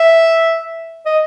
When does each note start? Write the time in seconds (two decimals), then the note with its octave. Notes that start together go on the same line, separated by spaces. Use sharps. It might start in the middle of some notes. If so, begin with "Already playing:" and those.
Already playing: E5
1.06 D#5